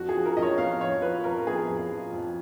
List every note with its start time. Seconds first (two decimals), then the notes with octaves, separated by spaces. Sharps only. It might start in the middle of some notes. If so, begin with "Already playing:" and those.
Already playing: F2 F#4
0.09 G#4
0.15 F3
0.25 A#4
0.37 F2 D#5
0.43 C#5
0.58 B3 F5
0.81 F2 C#5
1.02 F3 B4
1.24 F2 A#4
1.47 B3 G#4
1.68 F2
1.90 F3
2.13 F2